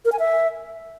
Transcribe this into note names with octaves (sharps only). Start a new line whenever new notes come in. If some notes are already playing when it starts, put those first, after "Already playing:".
A#4
G#5
E5